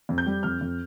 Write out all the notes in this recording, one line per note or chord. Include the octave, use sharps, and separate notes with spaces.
F2
G6
G3
F2 F6
F2